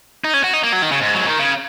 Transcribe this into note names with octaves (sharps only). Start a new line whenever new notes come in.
D#4
C#4
F#4
D#4
A#3
F#3
D#3
C#3
G#2
F#3
D#3
C#3